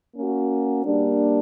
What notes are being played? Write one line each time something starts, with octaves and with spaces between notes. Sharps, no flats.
A#3 C#4 F#4
G3 A#3 D4